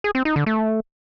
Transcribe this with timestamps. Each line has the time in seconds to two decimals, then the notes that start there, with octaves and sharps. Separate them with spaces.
0.04 G#4
0.15 C4
0.25 D#4
0.36 D3
0.46 A3